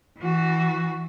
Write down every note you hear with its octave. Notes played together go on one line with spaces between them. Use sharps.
E3 F#4